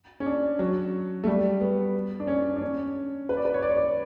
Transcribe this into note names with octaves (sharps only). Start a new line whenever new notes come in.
C#4
D4
F#3
A3
G3
B3
D4
C#4
D4
C#4
B4
D5
B4
C#5
D5
C#5
D5